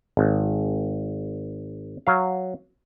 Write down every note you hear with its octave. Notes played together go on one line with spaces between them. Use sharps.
G#1
F#3 F5